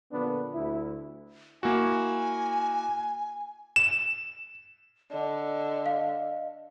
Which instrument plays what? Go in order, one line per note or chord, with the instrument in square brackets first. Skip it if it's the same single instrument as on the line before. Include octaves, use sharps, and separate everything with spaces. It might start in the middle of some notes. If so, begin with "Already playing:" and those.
[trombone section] A#2 D3 F3 B3 D4
D2 E4
[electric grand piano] A#3 E4 F#4 [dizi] G#5
[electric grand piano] E7
[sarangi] D3 [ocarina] D#5
[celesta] F5